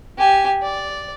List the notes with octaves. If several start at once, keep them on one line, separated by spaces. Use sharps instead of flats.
G4 G#5
D5